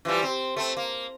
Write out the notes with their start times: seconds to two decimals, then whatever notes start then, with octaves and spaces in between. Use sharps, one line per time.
0.05 E3 F3 G3
0.23 C4
0.56 A3 C4
0.77 A#3